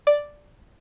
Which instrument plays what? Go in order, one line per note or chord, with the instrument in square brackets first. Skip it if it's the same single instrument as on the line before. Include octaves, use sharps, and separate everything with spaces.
[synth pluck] D5